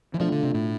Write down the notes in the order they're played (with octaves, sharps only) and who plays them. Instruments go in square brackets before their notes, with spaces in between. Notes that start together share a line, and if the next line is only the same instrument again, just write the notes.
[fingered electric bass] E3
[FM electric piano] B2 A3 D4 F4 [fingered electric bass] F3
[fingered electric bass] D3
C3
A2